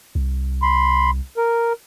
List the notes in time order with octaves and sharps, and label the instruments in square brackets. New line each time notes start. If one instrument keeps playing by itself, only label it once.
[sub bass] C2
[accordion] B5 C6
A#4